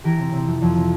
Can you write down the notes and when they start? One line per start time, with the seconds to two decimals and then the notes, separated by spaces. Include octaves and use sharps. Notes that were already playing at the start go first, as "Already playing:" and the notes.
0.04 E3 G4 A#4
0.18 C3
0.33 C3
0.47 F2
0.62 F2
0.76 C3